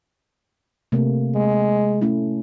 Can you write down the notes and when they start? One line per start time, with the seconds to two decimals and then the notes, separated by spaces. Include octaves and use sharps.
0.92 C3 A3 A#3
1.34 G#3
2.01 A3 C#4 E4